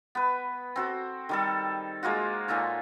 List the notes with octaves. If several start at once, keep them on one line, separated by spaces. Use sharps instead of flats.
B3 B4
C4 F#4 A4
D#3 G3 A4
G#3 A#3 F4 F#4
A#2 D#4 A4 C#5